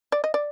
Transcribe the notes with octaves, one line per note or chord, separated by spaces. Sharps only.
D5
D#5
D5